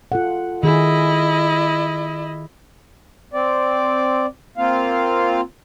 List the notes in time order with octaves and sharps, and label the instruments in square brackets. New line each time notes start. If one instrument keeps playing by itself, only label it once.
[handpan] F4 A4 F#5
[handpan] D#3 G#4 [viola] E4 D#5
[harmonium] C4 D5
A#3 C4 F4 F5